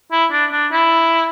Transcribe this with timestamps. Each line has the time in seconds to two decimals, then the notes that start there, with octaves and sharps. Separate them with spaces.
0.12 E4
0.32 D4
0.52 D4
0.72 E4